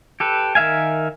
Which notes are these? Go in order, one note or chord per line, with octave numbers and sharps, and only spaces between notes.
G4 A4 B4
D#3 A#4 E5 F5 G#5